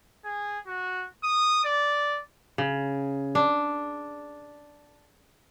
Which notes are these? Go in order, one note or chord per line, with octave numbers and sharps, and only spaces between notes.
G#4
F#4
D#6
D5
C#3
D4